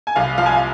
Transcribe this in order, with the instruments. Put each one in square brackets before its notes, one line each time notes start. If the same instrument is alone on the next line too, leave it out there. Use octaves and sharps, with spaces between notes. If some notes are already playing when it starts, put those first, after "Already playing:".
[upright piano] G#5
[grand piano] C2 [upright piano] F5
[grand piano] F3 [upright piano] F5
[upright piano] G#5
F5